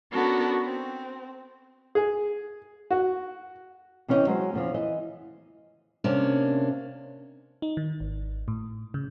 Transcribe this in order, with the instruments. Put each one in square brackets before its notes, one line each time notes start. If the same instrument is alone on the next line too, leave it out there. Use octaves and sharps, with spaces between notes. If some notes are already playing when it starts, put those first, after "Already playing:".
[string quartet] B3 C#4 D4 F#4 A4 A#4
C4
[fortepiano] G#4
F#4
[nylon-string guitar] C3 E3 C#4 G#4 D#5 G5
F#3 G#3 C5
E2 C#3 F3
E3 D#5
[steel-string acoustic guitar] C3 A#3 C#4 D4
[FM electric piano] D#4
D#3
G#1
A2
C#3